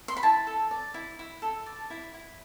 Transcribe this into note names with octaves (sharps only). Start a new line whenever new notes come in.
C6
B5
E4 A5
A4
D5
E4
E4
A4
D5
E4
E4